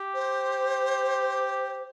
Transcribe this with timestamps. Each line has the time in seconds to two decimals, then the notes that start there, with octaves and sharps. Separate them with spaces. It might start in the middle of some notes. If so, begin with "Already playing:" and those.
Already playing: G4
0.14 C5